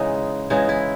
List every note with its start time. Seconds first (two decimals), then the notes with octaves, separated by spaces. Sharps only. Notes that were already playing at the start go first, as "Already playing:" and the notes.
Already playing: C#3 E3 G#3 D#4
0.50 C#3 E3 G#3 D#4
0.69 E4